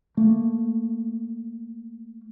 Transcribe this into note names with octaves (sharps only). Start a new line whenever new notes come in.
A3 A#3